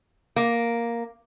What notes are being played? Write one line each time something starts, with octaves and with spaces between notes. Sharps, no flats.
A#3